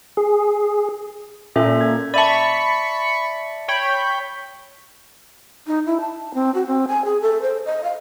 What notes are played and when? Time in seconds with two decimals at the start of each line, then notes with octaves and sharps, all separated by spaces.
0.17 G#4
1.56 A#2 C#4 A4 E5
1.81 G#6
2.14 D5 E5 A5 B5 C#6
3.68 C#5 G5 B5
5.67 D#4
5.86 E4
6.00 A5
6.34 C4
6.54 F#4
6.67 C4
6.88 G#5
7.05 G#4
7.21 A4
7.42 C5
7.66 D#5
7.84 F5